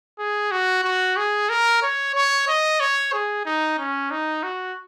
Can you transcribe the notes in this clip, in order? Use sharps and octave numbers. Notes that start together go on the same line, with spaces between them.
G#4
F#4
F#4
G#4
A#4
C#5
C#5
D#5
C#5
G#4
D#4
C#4
D#4
F#4